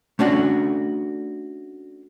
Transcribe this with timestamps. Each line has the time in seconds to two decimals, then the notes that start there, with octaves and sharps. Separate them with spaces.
0.19 A3 C#4 D4 F#4